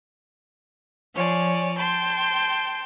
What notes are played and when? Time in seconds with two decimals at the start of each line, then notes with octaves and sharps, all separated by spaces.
1.16 F3 C#5 D5 G#5
1.76 G5 A5 C6